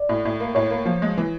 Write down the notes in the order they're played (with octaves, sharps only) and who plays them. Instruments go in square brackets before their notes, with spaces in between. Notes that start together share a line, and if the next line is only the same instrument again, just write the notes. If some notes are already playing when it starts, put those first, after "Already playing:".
Already playing: [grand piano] D5
[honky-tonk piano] A2
A2
A#3
[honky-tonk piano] A2 [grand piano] C#5
[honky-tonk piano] A#3
F3
G#3
E3